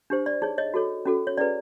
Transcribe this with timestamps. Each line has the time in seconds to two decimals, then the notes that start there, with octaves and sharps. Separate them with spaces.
0.10 D4 G4 C5
0.26 D5
0.42 D#4 G#4 C#5
0.58 C#5 D#5
0.74 F#4 A4 C#5
1.05 C#4 F#4 A4
1.27 C#5
1.37 C#4 E4 G#4 B4 D5